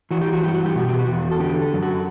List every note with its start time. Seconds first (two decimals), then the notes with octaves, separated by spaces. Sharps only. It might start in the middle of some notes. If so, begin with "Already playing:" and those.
0.11 E3 F#4
0.21 G4
0.33 F#4
0.43 G2 G4
0.54 F#4
0.65 G4
0.76 B2 F#4
0.88 G4
0.99 F#4
1.07 E2
1.31 A4
1.40 D3 G4
1.62 A4
1.73 F#2
1.83 F#4